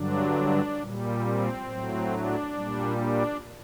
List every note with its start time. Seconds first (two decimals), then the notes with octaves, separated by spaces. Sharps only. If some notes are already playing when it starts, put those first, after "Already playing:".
Already playing: G2 D3 F#3 D4
0.79 A#2 G3
1.23 C4
1.65 A2 F#3
2.10 D4
2.53 A#2 G3
2.97 D4